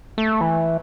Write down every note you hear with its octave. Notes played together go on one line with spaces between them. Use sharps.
A3
E3